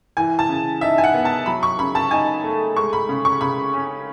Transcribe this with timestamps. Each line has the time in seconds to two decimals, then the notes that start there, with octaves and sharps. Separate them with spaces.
0.17 E3 G#5
0.39 A5
0.49 C#3
0.81 D#4 E5
0.98 G#5
1.04 F#5
1.14 B3
1.25 A5
1.46 F#3 B5
1.63 C#6
1.79 C#3 B5
1.95 A5
2.11 D#4 G#5
2.44 A3
2.77 G#3 C#6
2.93 B5
3.09 C#3
3.25 C#6
3.41 C#3 B5
3.74 C#4